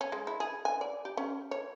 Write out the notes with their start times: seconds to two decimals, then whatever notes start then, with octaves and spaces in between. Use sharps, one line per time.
0.01 C#4
0.12 G#3
0.27 E4
0.40 G#4
0.65 G#5
0.81 D5
1.05 G4
1.17 C#4
1.51 C#5